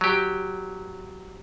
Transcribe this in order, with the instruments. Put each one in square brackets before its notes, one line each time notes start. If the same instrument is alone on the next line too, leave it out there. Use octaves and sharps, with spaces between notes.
[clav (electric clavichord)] F#3 G4